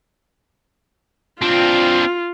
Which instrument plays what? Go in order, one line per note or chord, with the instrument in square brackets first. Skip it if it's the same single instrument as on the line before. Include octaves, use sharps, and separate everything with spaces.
[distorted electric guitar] C4 D4 [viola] F4